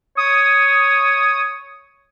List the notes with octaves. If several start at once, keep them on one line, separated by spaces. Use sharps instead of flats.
C#5 D#6